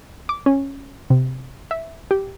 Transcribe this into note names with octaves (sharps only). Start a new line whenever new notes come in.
D6
C#4
C3
E5
G4